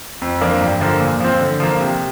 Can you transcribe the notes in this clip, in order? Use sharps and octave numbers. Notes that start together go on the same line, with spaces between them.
F2
F3 A#3 D4 A#4
G2
D3 F3 A#3
A#2
F3 C4
D3
F3 A#3 F4
C3